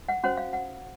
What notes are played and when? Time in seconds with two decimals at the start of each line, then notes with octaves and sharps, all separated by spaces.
0.09 F#5
0.23 C#4 F#4 C5 F#5
0.37 F5
0.53 F#5